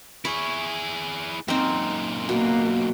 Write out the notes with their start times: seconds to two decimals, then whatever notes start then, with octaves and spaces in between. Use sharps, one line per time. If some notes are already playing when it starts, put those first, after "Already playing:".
0.25 E4 G#4 C#5
1.48 F#2 A#2 C4 D#4
2.29 B2 A#3